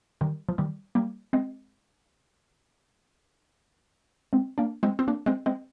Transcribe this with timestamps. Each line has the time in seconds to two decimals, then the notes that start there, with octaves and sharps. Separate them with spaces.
0.21 D#3 G3
0.49 F3
0.58 D#3 G3
0.95 G3 A#3
1.33 G#3 C4
4.33 G#3 C4
4.58 A#3 D4
4.83 G#3 C4
4.99 C4
5.08 A#3 D4
5.26 G#3 C4
5.46 G#3 C4